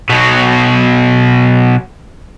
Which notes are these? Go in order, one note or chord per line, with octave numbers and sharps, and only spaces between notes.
B2 F#3